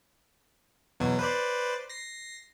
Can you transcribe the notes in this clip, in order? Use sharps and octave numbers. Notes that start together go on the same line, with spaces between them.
E2 B2 F#3
B4 C5 D5
A#6 C7